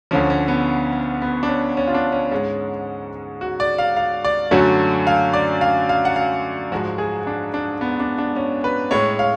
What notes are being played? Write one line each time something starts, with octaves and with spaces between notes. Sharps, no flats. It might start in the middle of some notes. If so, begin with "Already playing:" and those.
D2 D3 F3 C#4
C#4
B3
B3
D4
C#4
C#4
F4
D4
C#4
G#2 G#3 C#4
F#4
D5
F5
F5
D5
F#2 D3 F#3 A3 F#4
F5
D5
F5
F5
F#5
F5
G#2 F3 G#3 F#4
G#4
D4
D4
B3
D4
D4
C#4
B4
A2 G#3 C#5
F5